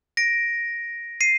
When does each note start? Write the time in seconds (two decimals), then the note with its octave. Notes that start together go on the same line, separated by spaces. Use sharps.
0.17 A#6 D7
1.21 C7 D#7